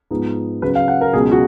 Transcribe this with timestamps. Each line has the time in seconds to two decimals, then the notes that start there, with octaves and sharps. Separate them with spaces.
0.11 G#2 F3 B3 D#4
0.62 C#3 F#3 C#4 B4
0.75 F5
0.88 F#5
1.01 A#4
1.13 C#2 B2 F#3 C#4 G#4
1.32 F#4